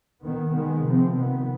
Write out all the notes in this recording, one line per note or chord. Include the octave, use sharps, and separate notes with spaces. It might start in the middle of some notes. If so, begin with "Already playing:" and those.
D#3 B3
D#3 G#3 B3
C3 F3 C4
C3 D#3 B3